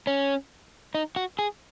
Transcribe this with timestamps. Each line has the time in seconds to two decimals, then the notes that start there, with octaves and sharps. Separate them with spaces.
0.07 C#4
0.95 D#4
1.16 F#4
1.39 G#4